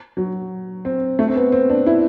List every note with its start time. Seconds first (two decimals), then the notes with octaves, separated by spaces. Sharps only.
0.17 F#3
0.85 C4
1.19 A3
1.28 C4
1.35 B3
1.52 C4
1.70 D4
1.87 E4